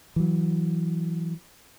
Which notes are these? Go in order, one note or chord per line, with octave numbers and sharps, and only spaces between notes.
E3 F#3